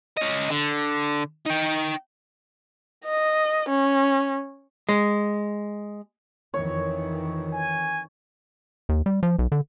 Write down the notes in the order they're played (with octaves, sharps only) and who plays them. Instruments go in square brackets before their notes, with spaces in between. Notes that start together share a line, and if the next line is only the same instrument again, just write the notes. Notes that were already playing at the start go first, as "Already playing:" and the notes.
[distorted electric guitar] C#4 D#5
D3
D#4 G5
[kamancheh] D#5
C#4
[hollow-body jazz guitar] G#3
[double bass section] F2 D#3 E3 [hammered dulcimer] C#5
[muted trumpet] G#5
[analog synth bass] D#2
G3
F3
B1
D3